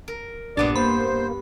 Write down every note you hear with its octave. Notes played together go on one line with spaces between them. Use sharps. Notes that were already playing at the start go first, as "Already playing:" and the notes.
A#4
A#1 G2 B3 D4 D5 A5
A#3 C5 B5